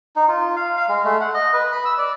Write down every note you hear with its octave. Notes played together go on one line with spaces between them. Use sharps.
D#4
F4
F5
F5
G#3
A3
F#5
D#5
B4
B5
E6
D5